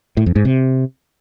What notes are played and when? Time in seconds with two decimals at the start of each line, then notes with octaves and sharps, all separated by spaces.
0.17 A2
0.26 F2
0.36 G#2
0.45 C3